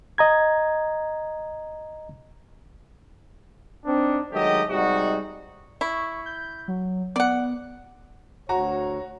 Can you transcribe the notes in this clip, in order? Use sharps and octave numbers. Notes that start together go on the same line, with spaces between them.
D#5 A#5 G#6
C4 D4 D#4
D#3 F#3 G#3 A3 G4 D#5
C3 G3 G#3 D#4 F#4
E4 C#6
G6
F#3
B3 D5 F#5
D2 F#4 C#5 A#5